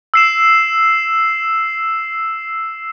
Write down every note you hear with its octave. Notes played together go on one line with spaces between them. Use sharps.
E6 C7 E7